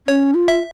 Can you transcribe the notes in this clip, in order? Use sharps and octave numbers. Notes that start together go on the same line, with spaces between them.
C#4 C#5
F4
E5